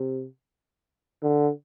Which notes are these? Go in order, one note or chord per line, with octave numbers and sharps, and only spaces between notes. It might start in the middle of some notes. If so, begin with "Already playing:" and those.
Already playing: C3
D3